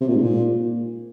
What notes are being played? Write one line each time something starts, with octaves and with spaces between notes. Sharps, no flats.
C3
A#2
G#2
A#2